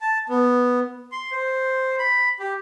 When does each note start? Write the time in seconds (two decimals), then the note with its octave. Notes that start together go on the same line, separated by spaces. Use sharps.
0.01 A5
0.29 B3
1.12 C6
1.32 C5
1.99 B5
2.40 G4